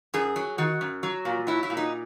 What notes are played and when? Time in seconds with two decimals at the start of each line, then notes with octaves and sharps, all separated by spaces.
0.14 F#2 G#4
0.36 F#3
0.58 D#3 F#4
0.81 F#2
1.03 F#3
1.25 A#2
1.47 F#3 E4
1.63 E4
1.70 A#2
1.77 D#4